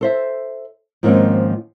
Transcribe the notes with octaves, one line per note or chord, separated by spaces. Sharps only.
A4 C5 E5
G#2 D#3 F3 A#3 C4 C#4